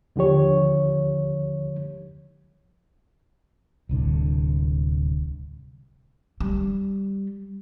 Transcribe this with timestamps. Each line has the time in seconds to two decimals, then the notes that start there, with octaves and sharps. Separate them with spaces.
0.16 D#2 D3 F3 G4 C#5
3.89 D1 C2 D3
6.40 G3